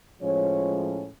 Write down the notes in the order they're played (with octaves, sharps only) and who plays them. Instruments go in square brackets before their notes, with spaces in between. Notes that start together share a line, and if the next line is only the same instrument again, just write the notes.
[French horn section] A2 F3 G#3 C#4 C#5